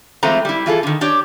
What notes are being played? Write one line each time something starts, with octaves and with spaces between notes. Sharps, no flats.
E3 G#3 A3 C4 F4 A#5
G3 E4
E3 F4 G#4 A4
D3 D#3
D4 G4 C#5 D5